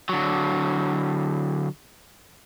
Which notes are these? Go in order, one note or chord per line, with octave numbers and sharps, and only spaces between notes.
D3 F#3